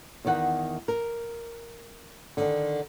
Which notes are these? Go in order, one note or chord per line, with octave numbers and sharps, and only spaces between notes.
E2 D#3 F#5
A#4
D3 D#3 D4